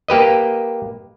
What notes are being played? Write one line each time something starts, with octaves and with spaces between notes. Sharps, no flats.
A#3 G4 B4 D#5